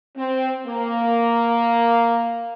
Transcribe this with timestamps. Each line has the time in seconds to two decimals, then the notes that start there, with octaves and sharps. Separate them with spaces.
0.17 C4
0.67 A#3